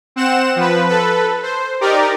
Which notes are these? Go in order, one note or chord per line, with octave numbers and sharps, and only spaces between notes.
C4 F#5 E7
F3 B4
A4 B4
C5
D#4 G4 A#4 D5